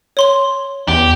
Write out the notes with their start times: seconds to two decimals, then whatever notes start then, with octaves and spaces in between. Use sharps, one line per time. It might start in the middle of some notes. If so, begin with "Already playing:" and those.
0.17 C#5 C6 G7
0.88 E2 G4